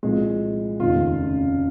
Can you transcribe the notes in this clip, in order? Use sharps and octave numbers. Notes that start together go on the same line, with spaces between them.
C2 A#2 F3 G#3
F1 D#2 C#3 F4